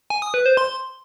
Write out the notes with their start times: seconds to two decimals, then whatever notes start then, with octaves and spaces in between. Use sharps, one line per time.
0.10 G#5
0.22 D#6
0.34 B4
0.46 C5
0.57 C6